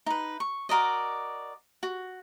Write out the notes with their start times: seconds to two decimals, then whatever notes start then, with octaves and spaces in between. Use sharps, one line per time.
0.06 D#4 B4
0.40 C#6
0.69 F#4 A#4 D5 D#5
1.83 F#4